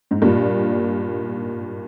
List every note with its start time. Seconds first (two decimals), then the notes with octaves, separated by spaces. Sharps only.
0.11 G#2
0.22 G2 A#2